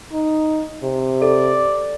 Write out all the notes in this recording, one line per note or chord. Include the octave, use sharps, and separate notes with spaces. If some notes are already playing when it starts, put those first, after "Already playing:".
D#4
C3
A4 D5